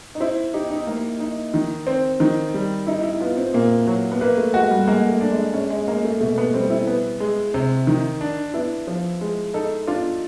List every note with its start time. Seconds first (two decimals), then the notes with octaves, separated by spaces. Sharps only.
0.15 D#4
0.20 E4 C5
0.54 D#4 G4
0.70 D#4
0.87 A#3
1.20 D#4
1.54 D#3
1.87 C4
2.20 D#3
2.54 G3
2.87 D#4 E4
3.03 E4
3.20 B3 F4
3.37 C4
3.54 A#2 A#3
3.87 F#3
4.12 B3
4.21 A#3 B4
4.37 A3
4.54 G#3 F#4
4.71 G3
4.87 G#3 A#3
5.09 A3
5.21 D4
5.32 G#3
5.54 G#3 C#4
5.70 G#3
5.87 G#3 A#3
6.04 A3
6.21 B2 A3
6.38 B3
6.54 G3 C4
6.70 E4
6.87 B3
7.20 G#3
7.54 C3
7.87 D#3
8.21 D4
8.54 B3 E4
8.87 F3
9.21 G#3
9.54 D#4 A4
9.87 D4 F4